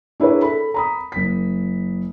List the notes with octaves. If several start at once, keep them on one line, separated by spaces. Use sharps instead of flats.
D4 E4 G#4 A#4 B4 C#5
A4 B5
A#5 B5 D#6
F#1 B6